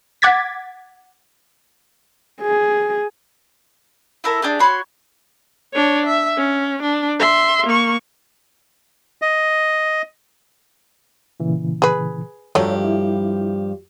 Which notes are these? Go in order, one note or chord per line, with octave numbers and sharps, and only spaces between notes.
F#5 D6 G#6 A6 B6
G#4
E4 A4 A#4
D4 G4 G#4
F#4 C#5 B5 C6
D4 C#5
E5
C#4
D4
E5 C6
A#3 C#6
D#5
A#2 C#3 E3
G#4 B4
G2 F3 F#3 A3 G4 C#5
E4